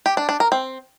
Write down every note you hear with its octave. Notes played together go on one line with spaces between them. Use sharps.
G4
D4
D4
A#4
C4